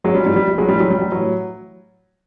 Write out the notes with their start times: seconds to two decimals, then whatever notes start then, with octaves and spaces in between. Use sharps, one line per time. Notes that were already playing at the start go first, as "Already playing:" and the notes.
0.04 G#1 F#3 G#3
0.15 G3
0.26 G#2 E3 G3
0.36 G3
0.48 A#1
0.58 F#3 G#3
0.69 A2 E3 G3
0.80 F#3
0.90 A1 G3
1.12 A2 E3 F#3